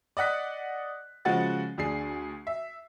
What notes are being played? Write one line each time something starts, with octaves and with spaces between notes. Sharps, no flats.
D5 D#5 F#5 F#6 B6
C#3 F3 G#3 F#4 F#5 A6
D2 D4 G#4 C7
E5